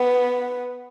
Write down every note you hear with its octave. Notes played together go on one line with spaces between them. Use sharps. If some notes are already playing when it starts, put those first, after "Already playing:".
Already playing: B3